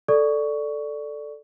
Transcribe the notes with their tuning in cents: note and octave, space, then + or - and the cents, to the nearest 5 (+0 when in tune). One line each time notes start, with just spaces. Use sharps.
A4 +0 D5 +0 C#6 +15